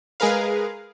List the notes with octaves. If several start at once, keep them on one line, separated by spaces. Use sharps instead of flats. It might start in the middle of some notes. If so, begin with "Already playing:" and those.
G#3 G#4 A#4 B4 F5